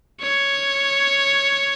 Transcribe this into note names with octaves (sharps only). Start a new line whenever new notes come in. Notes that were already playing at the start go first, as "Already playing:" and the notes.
C#5